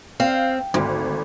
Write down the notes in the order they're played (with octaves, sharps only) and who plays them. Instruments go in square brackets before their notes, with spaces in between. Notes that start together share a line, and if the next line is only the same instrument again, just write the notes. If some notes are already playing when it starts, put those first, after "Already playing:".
[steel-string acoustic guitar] C4 [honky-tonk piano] F5
[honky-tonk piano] G#1 [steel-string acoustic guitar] D2